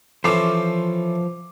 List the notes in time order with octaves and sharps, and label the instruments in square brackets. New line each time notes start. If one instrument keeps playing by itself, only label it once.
[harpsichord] E3 C#4 A4 [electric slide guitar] F3 C5 [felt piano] D6 C7